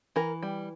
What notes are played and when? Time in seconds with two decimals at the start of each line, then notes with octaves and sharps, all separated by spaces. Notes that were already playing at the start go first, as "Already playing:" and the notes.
0.16 E3 A#4
0.43 G3